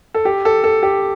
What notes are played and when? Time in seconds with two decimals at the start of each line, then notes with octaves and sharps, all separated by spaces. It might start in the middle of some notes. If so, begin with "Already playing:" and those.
0.14 A4
0.25 G4
0.45 A4
0.64 A4
0.83 G4